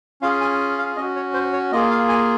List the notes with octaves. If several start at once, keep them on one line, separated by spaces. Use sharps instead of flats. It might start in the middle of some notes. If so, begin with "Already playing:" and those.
C#4 F4 G#4 F5
G#5
F5
C#4 F#4 D#5
C#5
C5
C#5
A#3 F4 G#4 D#5
F5
G#5